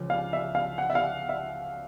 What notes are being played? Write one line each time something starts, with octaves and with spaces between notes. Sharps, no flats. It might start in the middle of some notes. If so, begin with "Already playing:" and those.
Already playing: C#2 C#3 F3 G#3
F5
E5
F5
F#5
E5
F5
E5